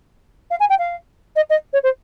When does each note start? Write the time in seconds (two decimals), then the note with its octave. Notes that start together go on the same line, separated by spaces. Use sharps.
0.50 F5
0.60 G#5
0.70 G5
0.79 F5
1.36 D#5
1.50 D#5
1.73 C#5
1.83 C5